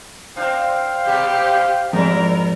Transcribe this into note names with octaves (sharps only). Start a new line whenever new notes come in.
C4 D4 C5 F5 G5
G2 A#2 G4
F2 G#2 F#3 E4 A#4